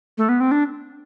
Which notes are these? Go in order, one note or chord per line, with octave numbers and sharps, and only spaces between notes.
A3
B3
C4
D4